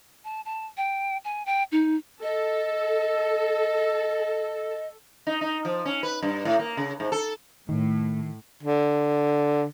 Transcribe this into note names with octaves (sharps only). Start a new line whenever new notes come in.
A5
A5
G5
G#5
G5
D#4
A4 D#5
D#4
D#4
F3
C#4
B4
G2
A2
A#3
C#3
G#2
A4
A2 D#3
D3